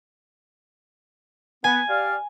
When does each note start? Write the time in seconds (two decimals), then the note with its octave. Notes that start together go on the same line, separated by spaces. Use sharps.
1.64 B3 G#5
1.89 G4 D5 F5